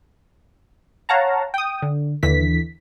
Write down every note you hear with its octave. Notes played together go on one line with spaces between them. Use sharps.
C#5 F5 F#5 A5 A#5
G5 D#6
D3
D#2 D3 E3 B6